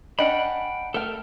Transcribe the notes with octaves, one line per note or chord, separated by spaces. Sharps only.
C#4 D4 D#5 F#5 G5 B5
A3 A4 A#4 G5 F6